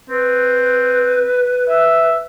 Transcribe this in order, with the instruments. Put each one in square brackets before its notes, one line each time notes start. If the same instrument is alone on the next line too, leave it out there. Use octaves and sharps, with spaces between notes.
[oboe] C4 [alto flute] B4
[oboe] E5